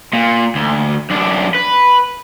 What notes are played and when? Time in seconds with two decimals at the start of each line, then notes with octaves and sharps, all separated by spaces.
0.14 A#2
0.55 D2
1.10 F#2 D4
1.55 B4